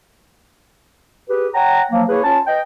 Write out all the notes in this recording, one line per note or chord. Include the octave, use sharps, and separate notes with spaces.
G4 G#4 B4
C#5 F#5 G5 A#5
F3 F#3 A#3
A#3 E4 G#4 B4 C#5
C#4 F4 C#5 A5
B4 D#5 G5